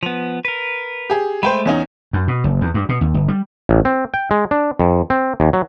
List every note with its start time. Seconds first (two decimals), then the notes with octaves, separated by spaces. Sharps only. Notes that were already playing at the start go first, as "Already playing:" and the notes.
0.03 F3 B3 F7
0.45 A#4 B4
1.10 G4 G#4
1.43 G#3 A3 C5 G5 B5
1.66 E2 C#4 D#4
2.13 F#2
2.28 B2
2.44 F#1
2.61 E2
2.74 G2
2.89 B2
3.01 D#2
3.14 G1
3.28 G3
3.69 A1
3.85 C4
4.14 G5
4.31 G#3
4.51 D4
4.79 F2
5.10 C4
5.40 D#2
5.53 F#3